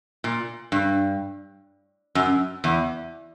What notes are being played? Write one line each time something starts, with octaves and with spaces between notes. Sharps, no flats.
A#2
G2
F#2
E2